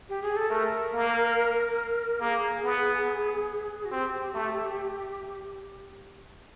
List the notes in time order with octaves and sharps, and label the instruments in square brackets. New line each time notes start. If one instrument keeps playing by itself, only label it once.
[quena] G4
G#4
A4
[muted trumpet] A3 [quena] A#4
[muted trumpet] A#3
[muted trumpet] A#3 [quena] G#4
[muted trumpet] B3
[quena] F#4
[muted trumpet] C4 [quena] G4
[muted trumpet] A3